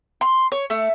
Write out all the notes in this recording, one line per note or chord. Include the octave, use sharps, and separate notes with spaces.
C6
C#5
A3